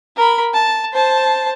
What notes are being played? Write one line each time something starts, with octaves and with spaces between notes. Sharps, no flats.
A#4 B5
A5
C5 A5